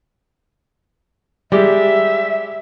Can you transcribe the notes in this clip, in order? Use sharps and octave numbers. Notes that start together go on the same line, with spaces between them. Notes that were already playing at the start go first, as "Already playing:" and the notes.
G3 G#3 G4 E5